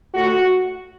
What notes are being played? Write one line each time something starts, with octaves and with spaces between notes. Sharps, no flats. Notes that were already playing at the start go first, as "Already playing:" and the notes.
A2 A3 F#4